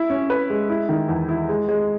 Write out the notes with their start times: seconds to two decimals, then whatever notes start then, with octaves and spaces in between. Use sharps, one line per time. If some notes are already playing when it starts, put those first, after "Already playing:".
Already playing: E4
0.10 C#4
0.30 B4
0.50 G#3
0.69 E4
0.89 D#3
1.09 E2
1.29 E4
1.49 G#3
1.69 G#3